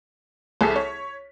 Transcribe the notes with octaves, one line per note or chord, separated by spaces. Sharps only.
C2 G#4 A4 B6
C#5